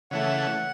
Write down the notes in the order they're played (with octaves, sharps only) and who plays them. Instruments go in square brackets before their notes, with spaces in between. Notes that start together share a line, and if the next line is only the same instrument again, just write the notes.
[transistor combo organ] C#3 E3 A3 [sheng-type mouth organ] F#5